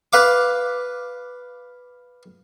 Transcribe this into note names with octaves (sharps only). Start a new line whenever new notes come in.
B4 F5 D6